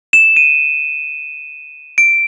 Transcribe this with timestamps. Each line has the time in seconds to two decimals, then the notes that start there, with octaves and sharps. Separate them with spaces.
0.13 E7
0.37 D#7
1.98 D7